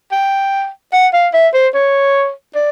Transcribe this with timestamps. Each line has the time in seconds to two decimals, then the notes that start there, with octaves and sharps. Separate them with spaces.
0.12 G5
0.93 F#5
1.14 F5
1.34 E5
1.54 C5
1.74 C#5
2.55 D5